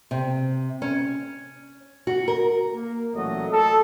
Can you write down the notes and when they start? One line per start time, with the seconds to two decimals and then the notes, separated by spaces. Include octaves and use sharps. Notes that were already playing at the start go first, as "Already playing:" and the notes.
0.11 C3
0.82 C#4
2.07 F#4
2.28 A#4
2.74 A#3
3.14 A1 A#2 F#3 A3 D#5
3.51 A4